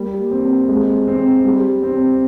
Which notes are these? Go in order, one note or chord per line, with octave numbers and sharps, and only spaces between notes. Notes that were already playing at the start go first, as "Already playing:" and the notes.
Already playing: G3 A#3
C4
G#3
C4
G3
C4